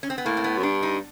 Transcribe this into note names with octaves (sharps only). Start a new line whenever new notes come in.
C#4
C4
B3
A2 A#3
C4
B3
F#2
G2 D4
D#4